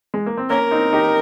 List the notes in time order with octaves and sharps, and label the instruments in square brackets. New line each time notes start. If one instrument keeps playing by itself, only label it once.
[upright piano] G#3
A#3
C4
[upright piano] A#3 C#4 [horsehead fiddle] A#4
[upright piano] C4 D#4
D#4 G4